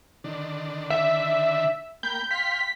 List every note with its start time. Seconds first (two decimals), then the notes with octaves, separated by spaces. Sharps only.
0.24 D3 D#3 D4
0.90 E5
2.03 A#3 G5 B5 G6
2.31 F5 G5 C6 B6